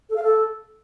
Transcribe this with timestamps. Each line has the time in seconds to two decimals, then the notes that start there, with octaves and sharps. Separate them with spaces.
0.09 A4
0.16 F5
0.22 A4